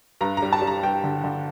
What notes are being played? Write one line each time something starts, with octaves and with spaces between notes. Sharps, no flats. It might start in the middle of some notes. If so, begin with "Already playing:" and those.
G2 A#5
A#5
G3
A5
G3
A#5
G2 G5
D3
D3